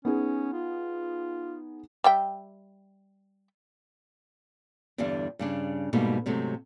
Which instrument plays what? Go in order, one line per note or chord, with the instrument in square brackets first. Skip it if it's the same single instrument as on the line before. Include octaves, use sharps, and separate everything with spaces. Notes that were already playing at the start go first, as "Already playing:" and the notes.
[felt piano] B3 D#4 G#4 [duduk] C#4
[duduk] F4
[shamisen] G3 E5 G5
[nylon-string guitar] E2 G2 D3 G3 D4
G2 C#3 D4
G#2 B2 G3 A3 A#3 D#4
G#2 C3 F#3 A3